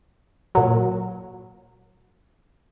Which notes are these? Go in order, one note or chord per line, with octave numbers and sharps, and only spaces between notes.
A#2 F#3